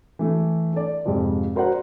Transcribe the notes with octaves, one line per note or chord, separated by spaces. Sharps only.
E3 A3
A4 D5
F2 G#2 C3 F3 G#3
F#4 A#4 C5 D5 F#5